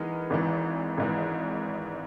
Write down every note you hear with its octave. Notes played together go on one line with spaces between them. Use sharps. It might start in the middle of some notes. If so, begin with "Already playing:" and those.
Already playing: E3 G#3 B3 D#4 A#4
G#1 G#2 E3
G#1 G#2 E3